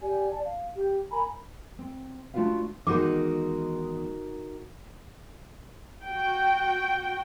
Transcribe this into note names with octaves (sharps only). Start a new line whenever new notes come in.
G4 D5 G#5
D5 A5
F5
G4
A#4 G#5 A#5 B5
C4
A3 D4 F4 F#4 B4 F5
E2 D#3 G#3 D#4 F#4 A#4 D6
F#4 G5